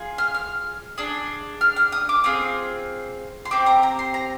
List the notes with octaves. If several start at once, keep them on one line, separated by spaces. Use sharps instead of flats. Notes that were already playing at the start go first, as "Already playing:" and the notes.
Already playing: F4 G#4
F6
F6
D4 G#4
F6
F6
D#6
D6
C4 F4 G#4 D#6
C6
C4 G4 D6
A#5
A#5
C6
A#5